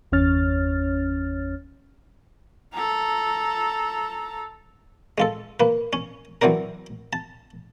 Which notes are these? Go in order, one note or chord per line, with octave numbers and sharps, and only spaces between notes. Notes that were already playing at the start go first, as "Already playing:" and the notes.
G1 E2 C#4 C#5 F6 A6
A4 A#5
G#3 F4 A4
A#3 B4
C#4
E3 F#3 C4 D4 A#4
A5